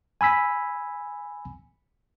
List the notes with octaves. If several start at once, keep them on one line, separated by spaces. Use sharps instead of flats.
G#5 B5 E6 B6